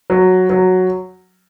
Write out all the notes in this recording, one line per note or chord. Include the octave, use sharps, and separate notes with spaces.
F#3
F#3